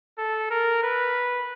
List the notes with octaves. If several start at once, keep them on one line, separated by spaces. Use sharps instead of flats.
A4
A#4
B4